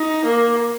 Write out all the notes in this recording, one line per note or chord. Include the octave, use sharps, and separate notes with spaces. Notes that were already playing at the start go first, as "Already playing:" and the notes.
Already playing: D#4
A#3